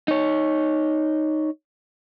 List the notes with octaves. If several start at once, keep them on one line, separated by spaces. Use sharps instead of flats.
D#4 C#5